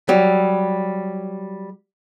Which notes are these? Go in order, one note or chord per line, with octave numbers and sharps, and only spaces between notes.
F#3 G3